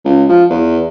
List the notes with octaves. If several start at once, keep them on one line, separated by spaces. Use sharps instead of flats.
C#2
F3
E2